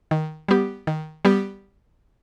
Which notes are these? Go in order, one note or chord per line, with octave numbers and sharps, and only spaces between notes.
D#3
G3 B3 G4
D#3
G3 B3 G4